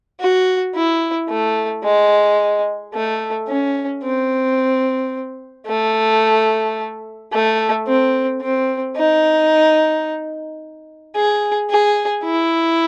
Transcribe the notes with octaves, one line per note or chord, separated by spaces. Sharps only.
F#4
E4
A3
G#3
A3
C#4
C4
A3
A3
C4
C4
D#4
G#4
G#4
E4